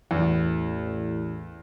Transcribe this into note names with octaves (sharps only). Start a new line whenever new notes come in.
A1 E2